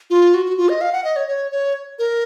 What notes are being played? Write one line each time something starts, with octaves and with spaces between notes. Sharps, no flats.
F4
F#4
F#4
F4
D#5
F5
F#5
D#5
C#5
C#5
C#5
A#4